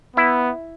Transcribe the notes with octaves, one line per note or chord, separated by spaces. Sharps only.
B3 E4